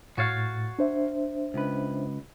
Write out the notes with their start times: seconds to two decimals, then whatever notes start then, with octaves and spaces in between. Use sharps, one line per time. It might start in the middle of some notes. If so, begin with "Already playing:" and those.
0.18 A2 F#4 C#5 F5 A6
0.79 D4 C5 E5
1.54 C#2 B4